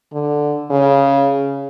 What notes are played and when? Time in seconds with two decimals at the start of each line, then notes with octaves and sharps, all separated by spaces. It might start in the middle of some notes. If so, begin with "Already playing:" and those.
0.13 D3
0.71 C#3